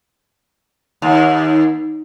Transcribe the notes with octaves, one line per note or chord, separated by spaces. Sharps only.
D#2